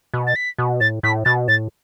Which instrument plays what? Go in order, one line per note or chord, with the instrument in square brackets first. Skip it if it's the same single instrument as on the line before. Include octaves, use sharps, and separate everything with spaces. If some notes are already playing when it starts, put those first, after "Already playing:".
[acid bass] B2
[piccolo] A6
B6
[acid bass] B2
[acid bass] A2 [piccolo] A6
[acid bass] A2 [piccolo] B6
[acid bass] B2 [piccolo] A6
[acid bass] A2 [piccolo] A6